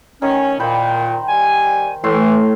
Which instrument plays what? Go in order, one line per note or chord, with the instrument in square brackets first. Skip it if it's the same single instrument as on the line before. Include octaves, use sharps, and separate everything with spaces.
[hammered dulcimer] D#3 [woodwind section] C#4
[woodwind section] A#2 [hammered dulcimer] C5 G5 B5
[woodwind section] G3 G#5
[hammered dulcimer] A2 A3 C6 [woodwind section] E3